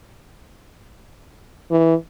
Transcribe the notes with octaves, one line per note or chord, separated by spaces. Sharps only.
E3